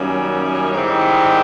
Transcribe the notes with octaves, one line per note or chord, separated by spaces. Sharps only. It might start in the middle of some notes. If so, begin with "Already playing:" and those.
Already playing: F#2 D#3 G3 A#3 C#4
G#2 D#3 G3 C4 E4